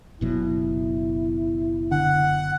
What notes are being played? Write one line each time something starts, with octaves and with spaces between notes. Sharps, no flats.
F#1 B2 F#3 E4
D3 F#5